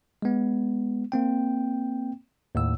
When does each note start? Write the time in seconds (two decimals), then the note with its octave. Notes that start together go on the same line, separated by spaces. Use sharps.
0.22 G#3 B3
1.12 A#3 C4 G5
2.55 D#2 A2 E6